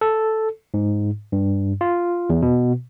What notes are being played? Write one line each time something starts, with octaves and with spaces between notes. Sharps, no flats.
A4
G#2
G2
F4
E2
B2